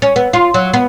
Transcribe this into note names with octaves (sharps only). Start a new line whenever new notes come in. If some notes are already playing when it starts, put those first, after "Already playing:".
C#4
B3
F4
F#3
B3